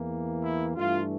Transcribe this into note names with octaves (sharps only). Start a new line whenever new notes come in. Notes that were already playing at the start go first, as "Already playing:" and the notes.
Already playing: E2 E3 A#3
E4
G2 E3 A3 D4 F4